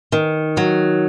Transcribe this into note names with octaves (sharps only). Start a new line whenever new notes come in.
D#3
F#3